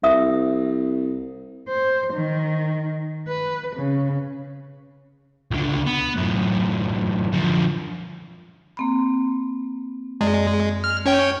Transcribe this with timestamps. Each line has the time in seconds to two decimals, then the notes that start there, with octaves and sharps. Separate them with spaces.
0.04 C2 E5 D#6
1.69 C5
2.13 D#3
3.28 B4
3.76 C#3
5.51 C#2 D3
5.87 B3
6.17 F#2 A2
7.32 D3 F3
8.77 A#3 C4 B5
10.21 F#2 G#3 D5
10.84 F6
11.06 C#4 C#5 G5